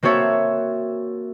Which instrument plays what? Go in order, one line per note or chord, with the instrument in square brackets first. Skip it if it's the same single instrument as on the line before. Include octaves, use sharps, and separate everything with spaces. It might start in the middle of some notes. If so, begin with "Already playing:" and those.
[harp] A#3 C4 F#4 A4 C#5 E5